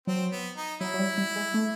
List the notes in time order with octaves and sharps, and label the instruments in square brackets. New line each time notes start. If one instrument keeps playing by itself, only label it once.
[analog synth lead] F#3 [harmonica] C4
[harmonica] B3
D#4
[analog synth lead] F#3 [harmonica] E4
[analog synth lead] F#3
G3
G3
G#3
A3